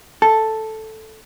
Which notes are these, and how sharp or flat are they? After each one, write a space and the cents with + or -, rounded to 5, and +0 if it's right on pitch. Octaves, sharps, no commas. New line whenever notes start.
A4 +0 A5 +0